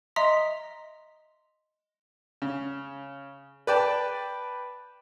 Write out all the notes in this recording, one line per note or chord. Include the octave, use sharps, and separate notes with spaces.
D#5 E5 A#5 C6 D#6
C#3
B4 D5 G5 A5